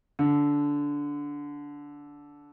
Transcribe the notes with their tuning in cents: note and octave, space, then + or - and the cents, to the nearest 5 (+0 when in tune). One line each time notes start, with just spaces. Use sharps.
D3 -15